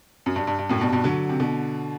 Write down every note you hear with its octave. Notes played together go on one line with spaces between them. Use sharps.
F#2
G2
G2
G2
F#2 A2
G2 B2
G2 B2
D3 F#3
C3
B2 D3